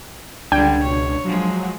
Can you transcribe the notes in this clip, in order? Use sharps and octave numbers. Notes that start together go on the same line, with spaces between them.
C#2 D3 G3 D4 G5 G#6
B2 C#5
F3 F#3 G#3